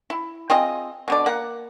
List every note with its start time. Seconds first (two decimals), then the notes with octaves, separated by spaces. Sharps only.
0.10 E4
0.50 C4 F4 G#4 D#5
1.08 B2 D3 D5
1.26 A#3 F#5